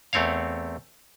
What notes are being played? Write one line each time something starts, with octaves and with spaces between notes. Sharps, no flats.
E2 A3 C4 C#5 F5